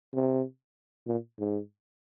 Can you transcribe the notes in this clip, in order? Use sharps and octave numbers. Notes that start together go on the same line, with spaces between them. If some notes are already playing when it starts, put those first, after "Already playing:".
C3
A#2
G#2